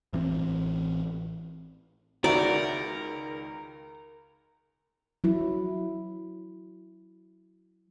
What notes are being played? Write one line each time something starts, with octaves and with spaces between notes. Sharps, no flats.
A1 E3 C4
C#2 D#3 F#4 A#4 D5 E5 A#5
F#3 E4